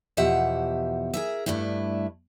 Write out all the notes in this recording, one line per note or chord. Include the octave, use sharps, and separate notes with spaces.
E2 B2 F3 G4 E5 F#5
G#4 A#4 E5
G2 A3 D4 E4